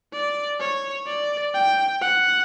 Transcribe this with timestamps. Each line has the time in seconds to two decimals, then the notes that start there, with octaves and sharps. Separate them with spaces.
0.13 D5
0.60 C#5
1.07 D5
1.54 G5
2.01 F#5